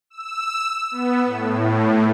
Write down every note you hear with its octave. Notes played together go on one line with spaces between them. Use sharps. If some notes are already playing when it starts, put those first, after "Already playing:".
E6
B3
A2